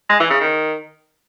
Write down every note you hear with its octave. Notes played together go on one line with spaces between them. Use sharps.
G#3
E3
C#3
D#3